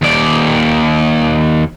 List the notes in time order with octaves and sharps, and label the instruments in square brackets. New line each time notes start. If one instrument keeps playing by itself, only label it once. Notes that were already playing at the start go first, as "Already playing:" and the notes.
[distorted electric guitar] D#2 D5